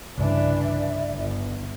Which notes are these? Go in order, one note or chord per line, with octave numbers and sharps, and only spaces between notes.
C2 G2 C#3 E3 D4 D5 E5
G1